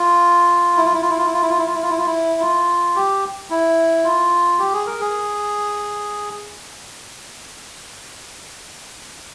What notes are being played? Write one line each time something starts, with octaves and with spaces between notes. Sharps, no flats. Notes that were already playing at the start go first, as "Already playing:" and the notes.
Already playing: F4
E4
F4
E4
F4
E4
F4
E4
F4
E4
F4
E4
F4
E4
F4
E4
F4
E4
F4
G4
E4
F4
G4
G#4
A#4
G#4